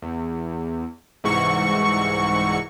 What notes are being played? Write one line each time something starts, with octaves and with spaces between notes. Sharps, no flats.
E2
C2 G#2 E3 F#4 C#6